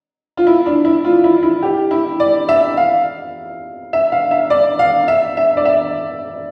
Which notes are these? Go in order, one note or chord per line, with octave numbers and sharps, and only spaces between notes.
F4
E4
D4
E4
F4
E4
E4
G4
E4
D5
E5
F5
E5
F5
E5
D5
F5
E5
E5
D5
E5